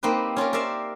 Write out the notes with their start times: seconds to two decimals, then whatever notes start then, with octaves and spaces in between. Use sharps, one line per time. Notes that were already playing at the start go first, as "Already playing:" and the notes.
0.03 A#3 C4 D#4 G4 B4
0.36 C#4 F4 G4 A#4
0.53 A#4 C5 D5 E5 F5